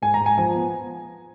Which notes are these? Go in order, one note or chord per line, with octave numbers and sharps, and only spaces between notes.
G#2 G#5
A#5
G#2
G#5
F3 G#5
B3